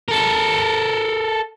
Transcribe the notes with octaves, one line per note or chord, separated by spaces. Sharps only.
A4 A#4